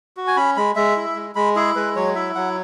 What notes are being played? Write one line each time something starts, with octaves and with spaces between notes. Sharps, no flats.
F#4
G#5
C#4 B5
G#3 B5
G#3 E5
E4
G#3
G#3 B5
E4 G#4
G#3 B4
F#3 C#5
E4 E5
F#3 F#5